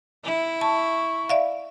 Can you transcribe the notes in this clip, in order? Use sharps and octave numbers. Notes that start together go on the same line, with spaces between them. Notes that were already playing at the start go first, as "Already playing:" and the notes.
E4
A5 C#6
D5 E5 F5